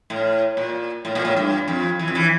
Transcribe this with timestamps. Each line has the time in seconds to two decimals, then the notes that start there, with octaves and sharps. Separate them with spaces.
0.10 A2
0.57 A#2
1.05 A2
1.15 A#2
1.25 A2
1.37 G2
1.68 F2
1.99 E3
2.08 F2
2.15 E3